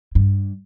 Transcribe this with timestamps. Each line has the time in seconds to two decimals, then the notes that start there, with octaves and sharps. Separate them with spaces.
0.15 G2